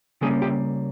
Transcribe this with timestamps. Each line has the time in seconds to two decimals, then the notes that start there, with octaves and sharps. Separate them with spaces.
0.21 C#3 G3 A#3 C#4 G#4
0.42 G4